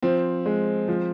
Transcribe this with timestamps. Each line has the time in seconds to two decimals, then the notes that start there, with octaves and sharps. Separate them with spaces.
0.02 F3 C4
0.46 G#3
0.88 F3